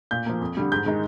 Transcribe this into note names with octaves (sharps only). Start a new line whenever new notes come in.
A#2 G6
F3 A#3
F2
D3 G3
G#2 G6
D#3 G#3 D#4